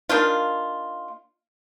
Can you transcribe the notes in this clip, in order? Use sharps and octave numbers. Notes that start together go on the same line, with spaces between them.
A#3 D4 D#4 F4